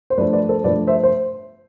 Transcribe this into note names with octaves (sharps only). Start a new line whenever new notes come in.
C5
G2 F3 A3 D4 B4 D5
B4 D5
A4 C5
G2 F3 A3 D4 B4 D5
C5 E5
C5